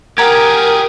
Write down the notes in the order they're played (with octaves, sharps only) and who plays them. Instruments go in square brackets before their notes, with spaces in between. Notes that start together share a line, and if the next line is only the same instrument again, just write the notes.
[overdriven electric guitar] G4 G#4 [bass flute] A#4 [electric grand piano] F#5 A#5 G#6